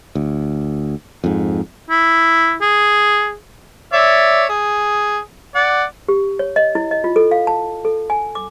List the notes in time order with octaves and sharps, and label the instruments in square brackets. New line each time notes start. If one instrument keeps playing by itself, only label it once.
[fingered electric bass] D2
F2 G#2
[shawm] E4
G#4
[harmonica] C#5 D5 E5
G#4
D5 F#5
[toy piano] G4
C#5
D#5
E4
D#5
F4
A4
F5
A5
A4
G#5
D6